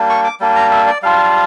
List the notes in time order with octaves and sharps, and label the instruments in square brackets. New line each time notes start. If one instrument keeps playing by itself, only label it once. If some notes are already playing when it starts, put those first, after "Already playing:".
Already playing: [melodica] G3 A#3 D4
C#6
D6
G3 A#3 D4
A#5
E5
D5
G3 D4 F4 F5